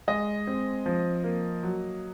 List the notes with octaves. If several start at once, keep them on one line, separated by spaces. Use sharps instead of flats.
G#3 D#5
C4
F3
A#3
F#3